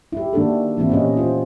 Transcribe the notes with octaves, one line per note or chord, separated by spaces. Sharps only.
E4 G4
D#3 A#3 D4 F#4 A4
E3 A#3 C4 E4 F#4
A#2 B3 C#4 G4 D#5
F4 C5